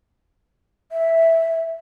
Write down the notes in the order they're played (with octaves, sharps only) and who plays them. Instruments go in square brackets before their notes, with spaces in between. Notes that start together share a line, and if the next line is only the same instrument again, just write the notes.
[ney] E5